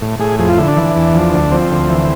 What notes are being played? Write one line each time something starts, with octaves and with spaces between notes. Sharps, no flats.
A2
A2 G#4
F2 G#4
F4
D3 E4
D4
E3
E2
F3
D2
F3 C4
D2
E3